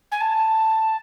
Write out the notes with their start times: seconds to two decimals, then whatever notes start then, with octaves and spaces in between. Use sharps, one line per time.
0.11 G#5
0.21 A5